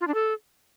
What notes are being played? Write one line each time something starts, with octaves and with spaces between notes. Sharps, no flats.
F4
D4
A4